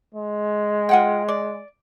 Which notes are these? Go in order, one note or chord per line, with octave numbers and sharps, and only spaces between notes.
G#3
F4 F#5 G5
D5